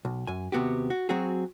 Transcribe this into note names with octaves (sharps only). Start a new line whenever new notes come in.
B1
F#2 G#5
D#2 C3 B3 F#4 G4
F#4
F#3 C4 F#4 G#4